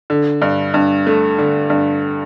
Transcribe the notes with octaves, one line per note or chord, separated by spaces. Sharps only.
D3
G2
G2
A3
D3
G2